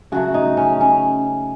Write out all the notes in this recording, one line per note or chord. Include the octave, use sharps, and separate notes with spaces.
C#3 F#3 A3 F#4
D#4
C#4
C#4